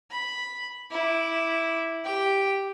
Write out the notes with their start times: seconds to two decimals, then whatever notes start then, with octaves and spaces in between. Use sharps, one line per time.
0.11 B5
0.91 E4 D6
2.05 G4 G5